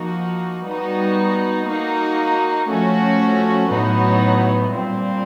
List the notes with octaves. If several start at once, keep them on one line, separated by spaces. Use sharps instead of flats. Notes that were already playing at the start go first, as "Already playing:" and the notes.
Already playing: F3 A#3 D#4 F#4
G3 B3 D#4 F#4
A#3 D#4 F#4
F3 A3 C#4 F#4
A2 F#3 B3 D#4 F#4
A#2 G3 C4